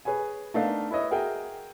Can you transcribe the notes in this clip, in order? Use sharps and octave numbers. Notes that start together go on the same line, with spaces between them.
G#4 B4 C#5 G#5
A3 B3 D4 D#4 A#4 F5
E4 B4 C#5 D#5 E5
F#4 G#4 A#4 E5 G5 G#5